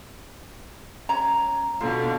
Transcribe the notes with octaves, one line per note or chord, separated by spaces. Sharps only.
C#4 A#5
B2 D3 F4